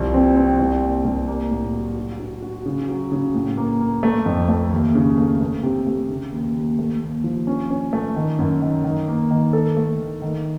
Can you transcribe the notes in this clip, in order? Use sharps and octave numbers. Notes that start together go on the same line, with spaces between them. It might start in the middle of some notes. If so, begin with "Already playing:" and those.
Already playing: C2 F3
C4
C4
C2
A#3
C2
A#3
A2
F#3
F#4
F#4
F#4
C#3
F#3
C#3
A2
A#3
A#3
A3
F2
A3
D#2
C#3
A3
A3
C3
A3
C#3
D#2
D#2
A3
D#2
F3
C#4
C#4
A3
D#3
F#2
D#3
D#3
A#3
D#3
A4
A3
D#3
D#3